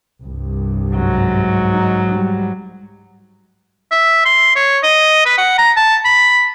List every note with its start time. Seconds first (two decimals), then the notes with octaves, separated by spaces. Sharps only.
0.23 C2 G2
0.93 G#2 F#3
1.72 D#4
2.13 G3
3.91 E5
4.25 C6
4.56 C#5
4.83 D#5
5.26 B4
5.38 F#5
5.58 A#5
5.77 A5
6.05 B5